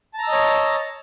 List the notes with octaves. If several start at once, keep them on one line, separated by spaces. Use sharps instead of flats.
C#5 D#5 A5 A#5 E6